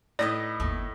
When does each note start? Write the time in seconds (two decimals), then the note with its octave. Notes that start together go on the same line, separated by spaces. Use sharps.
0.19 A2 D#4 B4 D5 D#5
0.60 G1 D#2 A3